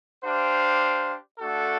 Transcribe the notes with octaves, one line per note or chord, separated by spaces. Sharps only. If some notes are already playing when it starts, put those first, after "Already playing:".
D4 G4 C5 F5
A3 D4 F#4 A4